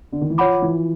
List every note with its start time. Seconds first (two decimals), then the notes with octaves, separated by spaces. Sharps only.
0.13 D3
0.21 D#3
0.30 E3
0.38 F3 C#5 F#5 B5 D6
0.62 E3